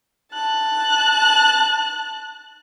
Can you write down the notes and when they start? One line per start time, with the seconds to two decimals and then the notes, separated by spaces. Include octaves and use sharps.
0.33 A5 F#6